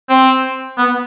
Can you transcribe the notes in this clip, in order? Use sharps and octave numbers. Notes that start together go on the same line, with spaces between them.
C4
B3